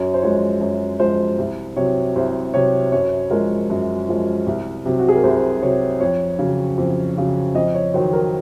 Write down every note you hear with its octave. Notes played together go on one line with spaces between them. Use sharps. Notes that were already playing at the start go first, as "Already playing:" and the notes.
Already playing: F#2 C#5
C5
F3 G#3 C#5
F#2 C#5
F3 G#3 C5
C2
C3 F#3 C#5
C2 C5
C3 F#3 C#5
F#2 C#5
F3 G#3 A#4
F#2
F3 G#3
C2
C3 F#3
F#4
G#4
A#4
C2 C5
C3 F#3 C#5
F2 C#5
C#3 F#3
F2
C#3 F#3
F2 D#5
C#5
D#3 F#3 C5
A#4